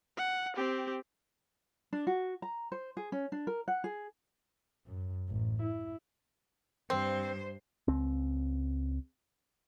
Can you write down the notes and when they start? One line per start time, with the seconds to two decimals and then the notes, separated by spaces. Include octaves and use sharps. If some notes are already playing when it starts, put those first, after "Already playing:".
0.17 F#5
0.56 C4 G4
1.93 D4
2.07 F#4
2.42 A#5
2.72 C5
2.97 G#4
3.12 C#4
3.32 D4
3.47 A#4
3.68 F#5
3.84 G#4
4.86 F#2
5.29 A1
5.63 E4
6.90 G2 C4 C5
7.88 C#2 C4